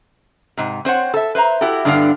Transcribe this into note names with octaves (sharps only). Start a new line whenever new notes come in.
G#2 C3
C4 C5 C#5 F#5
A4 E5
B4 C5 E5 A#5
E4 F#4 G4 A4
G2 D3 B3 D4 F#4 F5